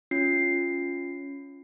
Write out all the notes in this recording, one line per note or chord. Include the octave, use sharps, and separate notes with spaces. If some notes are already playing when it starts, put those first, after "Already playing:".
C#4 F4 C7